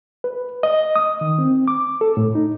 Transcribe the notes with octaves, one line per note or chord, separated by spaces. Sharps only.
B4
D#5
D#6
D#3
C4
D6
A4
A2
D#4